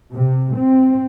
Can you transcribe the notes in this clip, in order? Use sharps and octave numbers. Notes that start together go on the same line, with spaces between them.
C3
C4